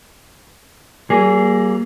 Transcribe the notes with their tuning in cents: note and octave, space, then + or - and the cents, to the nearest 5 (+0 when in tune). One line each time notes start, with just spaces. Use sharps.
G3 -45 A#3 +0 G#4 +0